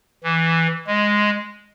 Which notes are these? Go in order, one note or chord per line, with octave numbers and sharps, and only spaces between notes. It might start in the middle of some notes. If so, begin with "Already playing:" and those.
E3
G#3